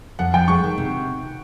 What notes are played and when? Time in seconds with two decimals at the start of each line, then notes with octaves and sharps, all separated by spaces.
0.19 F2 F#5
0.34 F3 G5
0.48 G#3 C#6
0.64 D#3
0.78 C3